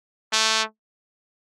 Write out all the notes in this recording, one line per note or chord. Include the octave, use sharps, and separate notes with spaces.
A3